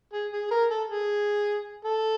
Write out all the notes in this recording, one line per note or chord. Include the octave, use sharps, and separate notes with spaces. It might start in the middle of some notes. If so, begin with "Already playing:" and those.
G#4
G#4
A#4
A4
G#4
A4